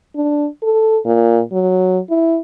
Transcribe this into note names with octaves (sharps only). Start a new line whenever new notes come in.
D4
A4
A#2
F#3
E4